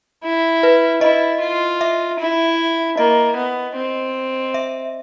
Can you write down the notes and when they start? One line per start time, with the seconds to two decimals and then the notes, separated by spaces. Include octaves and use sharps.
0.24 E4
0.63 B4
1.01 E4 D#5
1.41 F4
1.81 E5
2.19 E4
2.97 A#3 D#5
3.37 B3
3.76 C4
4.54 E5